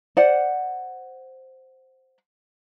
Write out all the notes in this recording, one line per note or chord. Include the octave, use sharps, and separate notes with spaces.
C5 D5 F#5